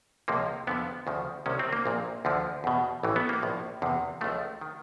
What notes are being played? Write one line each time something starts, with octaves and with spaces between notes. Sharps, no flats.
C#2 C3 F3 A#3
F2 D3 F3 B3
D2 C#3 F3
C2 C3 D#3 C#4
C4
A#3
A#1 A#2 F3
D2 D3 F3
E2 B2
A1 A2 E3
B3
A#3
A#1 A2 F3
E2 C3 D#3
C#2 C#3 F3 A3
D#3